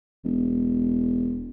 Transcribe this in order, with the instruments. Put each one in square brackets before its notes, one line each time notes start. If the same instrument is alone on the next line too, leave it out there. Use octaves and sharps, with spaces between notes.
[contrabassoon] E1